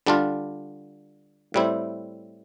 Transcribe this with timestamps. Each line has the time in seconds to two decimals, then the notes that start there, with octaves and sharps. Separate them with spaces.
0.06 D3 G3 D4 F4
1.54 A2 G3 C4 E4